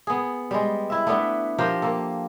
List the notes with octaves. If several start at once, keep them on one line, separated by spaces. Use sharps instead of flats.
B3 G#4
G3 G#3
E4 E5
A3 B3 D4 B4
F3 G4 A#4 C5
A#3 A4